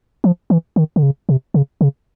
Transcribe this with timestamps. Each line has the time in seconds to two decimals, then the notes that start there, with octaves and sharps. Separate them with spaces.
0.24 F3
0.50 E3
0.76 D#3
0.96 D3
1.03 C#3
1.29 C3
1.54 C#3
1.81 C#3